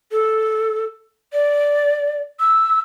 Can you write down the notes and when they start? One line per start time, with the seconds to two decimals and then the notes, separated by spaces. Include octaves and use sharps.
0.12 A4
1.33 D5
2.40 E6